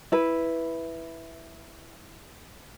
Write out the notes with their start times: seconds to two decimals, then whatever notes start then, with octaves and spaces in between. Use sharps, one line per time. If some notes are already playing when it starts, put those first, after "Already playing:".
0.12 E4 B4